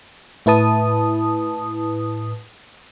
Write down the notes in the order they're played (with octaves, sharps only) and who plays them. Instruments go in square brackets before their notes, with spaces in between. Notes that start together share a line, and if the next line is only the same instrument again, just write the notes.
[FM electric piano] A2 E4 B4 A5 D#6